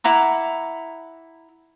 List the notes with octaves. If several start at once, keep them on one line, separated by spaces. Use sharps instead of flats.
E4 F#5 A#5 D6